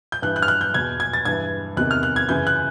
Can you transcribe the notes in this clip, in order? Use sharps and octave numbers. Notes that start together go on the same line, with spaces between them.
G6
G2 E3 F#6
F#6
F6
F#6
G6
E2 B2 G#6
G#6
A6
G2 E3 G#6
E2 C3 D#3 F#6
F6
F#6
G#6
F#2 C#3 E3 G6
F#6